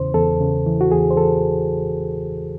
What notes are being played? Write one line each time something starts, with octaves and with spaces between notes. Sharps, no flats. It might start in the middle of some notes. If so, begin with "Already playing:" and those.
Already playing: E2 C#3 E3 C5
E2 A4
C#3
E3
F#4
E2 G#4
C5
E2 A4